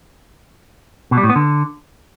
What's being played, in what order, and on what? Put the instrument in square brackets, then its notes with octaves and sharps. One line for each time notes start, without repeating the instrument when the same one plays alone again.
[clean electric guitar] B2
G3
A2
B3
D3